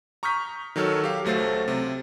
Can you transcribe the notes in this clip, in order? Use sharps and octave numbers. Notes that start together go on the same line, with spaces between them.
A#5 C#6 D#6 F6 G6 B6
D#3 F#3 A4 C#5 F6
G4 F5
C#2 F#3 A3 C5 A6
C3